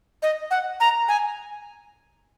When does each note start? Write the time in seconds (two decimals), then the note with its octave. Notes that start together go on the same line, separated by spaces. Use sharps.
0.23 D#5
0.51 F#5
0.80 A#5
1.08 G#5